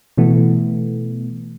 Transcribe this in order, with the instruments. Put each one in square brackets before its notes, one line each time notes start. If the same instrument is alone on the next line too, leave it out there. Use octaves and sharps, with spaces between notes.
[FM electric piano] B2 E3 A3 B3